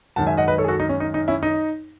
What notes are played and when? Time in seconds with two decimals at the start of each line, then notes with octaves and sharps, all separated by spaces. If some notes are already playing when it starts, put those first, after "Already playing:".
0.16 F#2 D#3 G#3 F#5 A5
0.27 E5 G#5
0.37 D#5 F#5
0.48 B4 D#5
0.58 A4 C#5
0.64 G#4
0.68 F#4 A4
0.80 D#4
0.89 C#4
1.00 D#4
1.14 D#4
1.28 C#4 E4
1.43 D#4